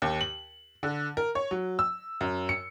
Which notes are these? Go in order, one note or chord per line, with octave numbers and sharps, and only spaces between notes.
D#2
F#7
D3
A#4
C#5
F#3
E6
F#2
C#7